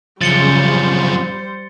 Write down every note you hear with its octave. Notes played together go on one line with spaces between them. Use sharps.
F#2 C#3 F3 G3 C5 A6 C#7 G7